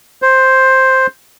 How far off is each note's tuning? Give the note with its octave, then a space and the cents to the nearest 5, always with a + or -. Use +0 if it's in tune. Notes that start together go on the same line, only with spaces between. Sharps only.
C5 +5